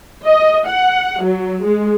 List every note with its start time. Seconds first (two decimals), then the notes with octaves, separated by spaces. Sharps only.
0.25 D#5
0.67 F#5
1.23 F#3
1.64 G#3